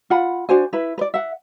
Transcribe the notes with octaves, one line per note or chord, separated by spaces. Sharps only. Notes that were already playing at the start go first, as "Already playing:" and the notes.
F4 F#5 B5
D4 F#4 C5 G#5
E4 B4
B4 D5
E5 F#5